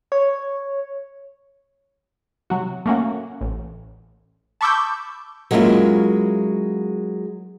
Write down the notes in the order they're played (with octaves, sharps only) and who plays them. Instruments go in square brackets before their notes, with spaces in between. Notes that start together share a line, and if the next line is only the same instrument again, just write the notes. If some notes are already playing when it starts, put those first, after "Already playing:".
[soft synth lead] C#5
[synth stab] C3 F#3 F#4
A3 A#3 C#4 F#4
A1
A5 B5 C#6 D6 E6 G6
[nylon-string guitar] F#3 G#3 A#3 C#4 E4 F4